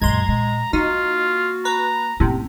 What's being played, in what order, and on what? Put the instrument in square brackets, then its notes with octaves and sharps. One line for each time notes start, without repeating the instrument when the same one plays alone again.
[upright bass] F#2 A#2 [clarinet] G#3 [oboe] A#5 [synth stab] C6 G#6
[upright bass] A#2 [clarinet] G#3
[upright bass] A#3 [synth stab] D#4 [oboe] F4 [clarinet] F#4
[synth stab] B4 [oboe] A#5
[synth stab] A2 C3 [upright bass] A#3 C#4